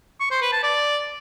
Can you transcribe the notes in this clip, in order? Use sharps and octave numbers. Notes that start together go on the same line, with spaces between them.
C#6
C5
B4
A5
D5